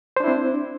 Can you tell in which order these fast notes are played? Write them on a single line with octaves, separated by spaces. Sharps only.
C5 D4 E4 C4